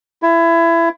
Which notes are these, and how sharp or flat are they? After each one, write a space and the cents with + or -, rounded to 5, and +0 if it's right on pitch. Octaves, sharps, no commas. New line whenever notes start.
E4 +25